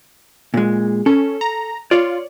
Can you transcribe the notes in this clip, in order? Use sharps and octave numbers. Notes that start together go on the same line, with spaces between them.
A#2 G#3
C#4 A4
A#5
F4 C#5 D5